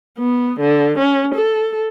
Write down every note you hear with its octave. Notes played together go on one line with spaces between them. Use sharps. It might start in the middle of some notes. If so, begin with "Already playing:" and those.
B3
D3
C#4
A4